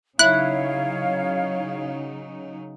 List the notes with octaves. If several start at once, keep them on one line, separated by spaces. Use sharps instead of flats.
C#3 F#3 D#4 E4 C#5 F5 F#6